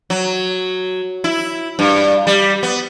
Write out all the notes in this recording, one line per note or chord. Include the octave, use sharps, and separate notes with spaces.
F#3
E4
G2
G3
B3